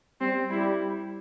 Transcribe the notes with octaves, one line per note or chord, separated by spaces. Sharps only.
G3 C4
G3 E4